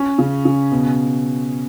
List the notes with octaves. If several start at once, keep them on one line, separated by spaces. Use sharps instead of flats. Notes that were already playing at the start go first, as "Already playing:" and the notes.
Already playing: C#4
C#3
C#3
B2